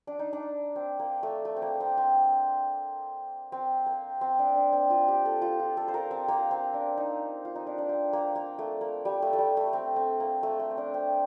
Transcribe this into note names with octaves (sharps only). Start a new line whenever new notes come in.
D4
D#4
D4
C4
A#3
A3
A3
C4
A#3
C4
C4
C4
A#3
C4
D4
D4
C4
F4
G4
A4
F4
F4
A4
C5
A#4
C4
A#3
C4
D4
D#4
F4
D#4
D4
D4
C4
A#3
A#3
A3
A#3
G3
A3
A3
G3
A3
C4
C4
A#3
A3
A3
C4
D4
C4